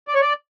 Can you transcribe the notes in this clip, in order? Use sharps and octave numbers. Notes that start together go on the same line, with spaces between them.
D5
C#5
D5